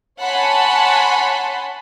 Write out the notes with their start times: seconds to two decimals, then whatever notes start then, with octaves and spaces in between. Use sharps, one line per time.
0.21 C#5 F#5 G#5 A5 B5 C6